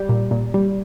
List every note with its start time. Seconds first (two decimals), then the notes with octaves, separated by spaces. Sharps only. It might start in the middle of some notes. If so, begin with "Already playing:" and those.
Already playing: G3 G4
0.09 A#2
0.31 A#2
0.54 G3